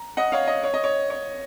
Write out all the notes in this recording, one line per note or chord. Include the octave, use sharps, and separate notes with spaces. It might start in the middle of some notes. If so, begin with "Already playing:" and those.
Already playing: A#5
D#5 F#5
C#5 F5
D#5
C#5
D#5
C#5
C#5